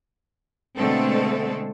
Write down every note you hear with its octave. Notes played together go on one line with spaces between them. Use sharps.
B2 D3 G#3 A3 C4 A4